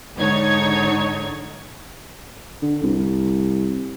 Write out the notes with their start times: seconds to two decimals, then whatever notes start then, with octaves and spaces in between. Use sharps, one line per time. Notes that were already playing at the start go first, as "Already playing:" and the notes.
0.18 G#2 D3 D#4 C#5 G#6
2.62 D3
2.83 C2